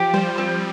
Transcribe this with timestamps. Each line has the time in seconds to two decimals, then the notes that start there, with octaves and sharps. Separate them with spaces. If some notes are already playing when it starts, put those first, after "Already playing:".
Already playing: F3 G4
0.14 G3 C5
0.38 C4